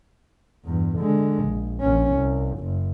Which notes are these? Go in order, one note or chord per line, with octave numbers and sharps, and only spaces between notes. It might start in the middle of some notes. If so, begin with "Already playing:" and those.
E2 G2
D3 G#3
A#1
A#1 C#4
C2
F#1